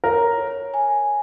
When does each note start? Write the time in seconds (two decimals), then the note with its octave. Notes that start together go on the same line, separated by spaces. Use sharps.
0.04 A#4 C#5
0.38 C#5
0.74 G#5